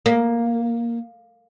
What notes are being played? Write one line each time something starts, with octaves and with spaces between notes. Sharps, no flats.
A#3